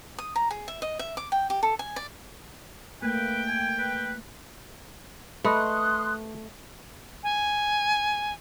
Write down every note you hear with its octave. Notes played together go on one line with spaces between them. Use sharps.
D#6
A#5
G#4
E5
D#5
E5
D6
G5
G4
A4
G#5
D5
A3 A#3 B4 G5
G#5
B4
A3 B4 D#5 C6 D#6 F#6
G#5